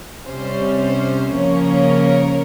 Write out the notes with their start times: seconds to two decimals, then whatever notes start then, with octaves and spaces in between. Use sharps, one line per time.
0.24 C3 G3 C#4 C5
0.78 C5
1.30 C#3 F3 A#3 C#4 A#4 C#5